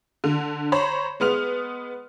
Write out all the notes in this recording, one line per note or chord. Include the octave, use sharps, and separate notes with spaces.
D3
C5 C#5 A#5 B5
G#3 B3 F6 F7